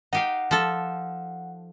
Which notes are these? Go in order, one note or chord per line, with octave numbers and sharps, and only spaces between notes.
D#4 G4 F5 F#5
F3 A4